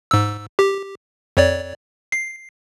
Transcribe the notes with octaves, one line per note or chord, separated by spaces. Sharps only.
G#2 E6
G4
F2 C#5 D5
C7